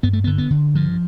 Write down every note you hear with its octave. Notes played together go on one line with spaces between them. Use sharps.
G2 B3
A3
B3
D3
B3
D3
G2 F3